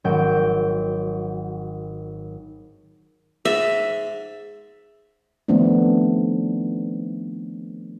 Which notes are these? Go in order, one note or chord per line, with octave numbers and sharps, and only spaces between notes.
G#1 F#3 G5
G#2 E5
D#3 F3 A3 B3 C4 D4